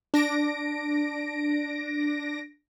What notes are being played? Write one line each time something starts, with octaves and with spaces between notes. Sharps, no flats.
D4 A#6 D7